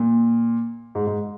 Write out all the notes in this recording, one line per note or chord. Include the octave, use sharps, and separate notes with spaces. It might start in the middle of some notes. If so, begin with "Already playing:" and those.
Already playing: A#2
G#2
G#2